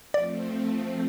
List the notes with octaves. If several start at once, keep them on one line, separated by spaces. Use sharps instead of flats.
F3 A3 C4 D5